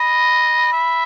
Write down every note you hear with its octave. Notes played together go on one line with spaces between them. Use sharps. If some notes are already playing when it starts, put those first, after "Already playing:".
Already playing: D#5 B5
E5